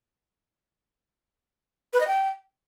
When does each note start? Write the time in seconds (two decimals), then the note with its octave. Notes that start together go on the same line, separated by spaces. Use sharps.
1.93 B4
2.00 D#5
2.07 G5